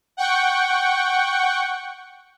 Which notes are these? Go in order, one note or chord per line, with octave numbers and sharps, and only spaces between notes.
F#5 G5 C#6